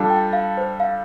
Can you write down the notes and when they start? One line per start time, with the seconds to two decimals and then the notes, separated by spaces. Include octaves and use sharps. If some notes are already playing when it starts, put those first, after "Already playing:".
Already playing: G3 D4 F4 A4
0.10 G5
0.33 F5
0.57 C5
0.80 F5